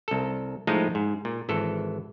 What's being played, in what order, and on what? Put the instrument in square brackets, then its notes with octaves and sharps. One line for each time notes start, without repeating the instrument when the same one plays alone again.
[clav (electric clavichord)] C2 A4
A2 F3 G#3 A3 D#4
G#2
A#2
G#1 E3 A4